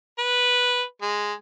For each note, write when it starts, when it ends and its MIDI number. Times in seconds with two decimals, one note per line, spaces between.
0.18 0.82 71
1.02 1.33 56